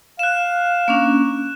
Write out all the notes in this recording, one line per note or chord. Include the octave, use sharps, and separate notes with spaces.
F5 F#6 E7
A#3 C#4 D4